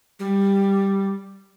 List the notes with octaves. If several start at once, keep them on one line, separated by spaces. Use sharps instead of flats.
G3